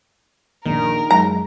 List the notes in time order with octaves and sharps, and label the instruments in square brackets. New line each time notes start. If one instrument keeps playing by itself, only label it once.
[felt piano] A#1 [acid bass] D#3 [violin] A#4
[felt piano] F#2 G#3 [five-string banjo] A#5